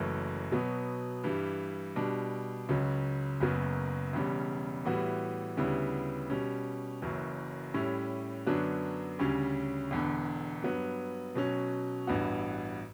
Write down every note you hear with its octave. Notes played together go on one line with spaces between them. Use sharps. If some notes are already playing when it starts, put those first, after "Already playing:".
Already playing: F#1 F#2 E3 A3
B2 F#3 B3
G2 E3 G3
B2 G3 D4
C#2 C#3 F#3
F#1 F#2 C#3 F#3 B3
E1 E2 C#3 G3
A2 E3 G3 B3 F#4
D2 C#3 G3 B3 E4
B2 G3 C#4
F#1 F#2 E3
A2 G3 C#4 E4
F#2 D3 F#3 B3 D4
D2 C#3 G3 C#4
E1 E2 D3
G2 F#3 B3
B2 F#3 C#4
A1 G2 E3 B3 F#4